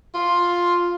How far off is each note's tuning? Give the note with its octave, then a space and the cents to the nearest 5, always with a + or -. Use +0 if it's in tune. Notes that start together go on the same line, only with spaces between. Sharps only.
F4 +5